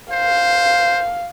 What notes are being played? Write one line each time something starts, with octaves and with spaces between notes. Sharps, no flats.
C5 F5